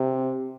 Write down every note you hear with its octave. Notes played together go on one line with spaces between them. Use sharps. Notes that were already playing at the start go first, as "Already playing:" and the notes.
Already playing: C3